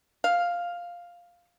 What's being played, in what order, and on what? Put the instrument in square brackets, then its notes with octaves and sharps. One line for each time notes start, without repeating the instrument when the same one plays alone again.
[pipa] F5